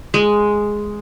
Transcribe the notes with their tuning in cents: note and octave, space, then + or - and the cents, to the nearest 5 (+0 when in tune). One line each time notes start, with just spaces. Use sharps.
G#3 +0